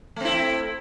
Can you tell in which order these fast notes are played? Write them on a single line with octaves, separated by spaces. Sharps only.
A3 C4 E4